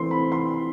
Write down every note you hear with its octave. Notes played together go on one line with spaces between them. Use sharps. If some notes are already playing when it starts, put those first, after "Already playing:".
Already playing: E3 A3 C4 E4 C6
B5
C6